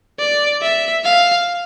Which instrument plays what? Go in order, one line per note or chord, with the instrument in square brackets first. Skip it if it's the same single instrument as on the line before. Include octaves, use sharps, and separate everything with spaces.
[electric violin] D5
E5
F5